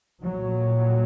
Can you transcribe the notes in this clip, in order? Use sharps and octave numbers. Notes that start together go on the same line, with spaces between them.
A#2 F#3